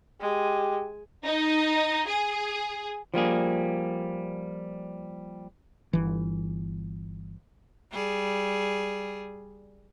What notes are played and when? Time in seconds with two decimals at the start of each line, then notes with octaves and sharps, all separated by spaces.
0.21 G#3 G4
1.25 D#4
2.07 G#4
3.14 F3 G3 A#3 G#4
5.93 G1 E3
7.93 G3 G#4